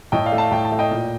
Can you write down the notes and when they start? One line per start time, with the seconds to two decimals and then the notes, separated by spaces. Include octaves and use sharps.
0.12 A2 D#5 G5
0.26 D5 F5
0.32 A3
0.38 F5 A5
0.52 A2 G5
0.65 A5
0.72 A3
0.79 D#5 G5
0.91 A#2